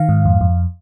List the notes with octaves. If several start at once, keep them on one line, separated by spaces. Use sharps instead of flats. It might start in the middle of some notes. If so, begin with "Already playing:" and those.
Already playing: D#3 F5
G#2
F2
F2